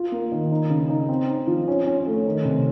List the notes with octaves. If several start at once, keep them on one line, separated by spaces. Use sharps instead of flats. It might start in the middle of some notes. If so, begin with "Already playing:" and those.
Already playing: F4
A#3
D#3
D#4
C#3
D#4
C4
D#4
F3
C#4
C#4
A3
D#3
C3